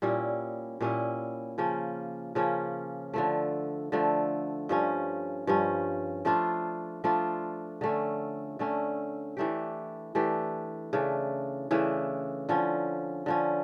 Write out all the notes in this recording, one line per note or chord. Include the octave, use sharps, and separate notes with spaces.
A#2 G3 C#4 E4
A#2 G3 C#4 E4
C#3 F3 A#3 C#4
C#3 F3 A#3 C#4
D3 F3 A3
D3 F3 A3
G2 F3 C#4
G2 F3 C#4
F3 A3 D4 F4
F3 A3 D4 F4
D3 A3 C#4
D3 A3 C#4
E3 A3 D4 G4
E3 A3 D4 G4
C#3 E3 A3 D4
C#3 E3 A3 D4
D3 F3 C#4
D3 F3 C#4